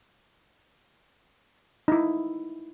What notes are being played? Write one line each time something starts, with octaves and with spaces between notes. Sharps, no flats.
D#4 E4